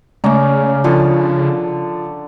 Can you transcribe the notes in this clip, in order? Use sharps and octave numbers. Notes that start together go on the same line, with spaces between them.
C#3 G#3 A3 C#4 D5 A#5
D3 F3 A4